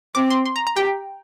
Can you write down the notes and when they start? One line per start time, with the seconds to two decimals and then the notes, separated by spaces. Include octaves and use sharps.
0.15 C4 D6
0.30 C6
0.46 C6
0.56 A#5
0.67 A#5
0.76 G4 G5